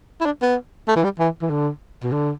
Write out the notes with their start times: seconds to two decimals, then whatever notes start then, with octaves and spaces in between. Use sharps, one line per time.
0.20 E4
0.26 D4
0.42 B3
0.88 A3
0.96 E3
1.04 G3
1.19 E3
1.42 E3
1.50 D3
2.03 B2
2.12 D3